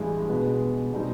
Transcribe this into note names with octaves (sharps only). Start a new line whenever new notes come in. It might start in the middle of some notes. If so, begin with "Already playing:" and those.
Already playing: A1 G2 E3 G#3
B2 G#3 B3
B2 G3 C4 D#4